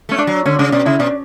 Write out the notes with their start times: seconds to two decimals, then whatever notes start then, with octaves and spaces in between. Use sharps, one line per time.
0.09 A3 C#4
0.18 D4
0.27 F#3
0.46 D3 C#4
0.59 C#3 D4
0.72 B2 D4
0.86 C#3 E4
0.99 B2 D4